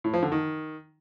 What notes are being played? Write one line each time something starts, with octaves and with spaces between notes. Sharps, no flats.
A2
F3
D3
D#3